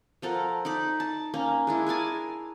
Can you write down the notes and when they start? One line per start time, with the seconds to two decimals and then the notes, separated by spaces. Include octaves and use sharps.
0.22 F3 A4 A#4 F#5
0.65 D#4 D5 B5
1.00 A5
1.34 A#3 C#4
1.67 G#3 D4 E4
1.86 G#4 A#4 G#5 A5